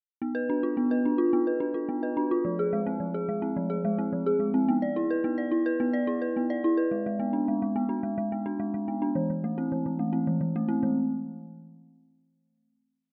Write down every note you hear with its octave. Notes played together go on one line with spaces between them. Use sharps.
B3
B4
D4
F4
B3
B4
D4
F4
B3
B4
D4
F4
B3
B4
D4
F4
F3
G#4
G#3
C4
F3
G#4
G#3
C4
F3
G#4
G#3
C4
F3
G#4
G#3
C4
B3
D5
E4
B4
B3
D5
E4
B4
B3
D5
E4
B4
B3
D5
E4
B4
G#3
G#3
B3
D4
G#3
G#3
B3
D4
G#3
G#3
B3
D4
G#3
G#3
B3
D4
E3
E3
A3
C4
E3
E3
A3
C4
E3
E3
A3
C4
E3